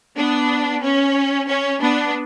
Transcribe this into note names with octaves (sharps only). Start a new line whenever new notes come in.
B3 D4
C#4
C#4
B3 D4